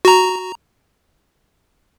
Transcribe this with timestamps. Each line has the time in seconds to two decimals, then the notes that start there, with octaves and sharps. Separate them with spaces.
0.05 F#4 A#5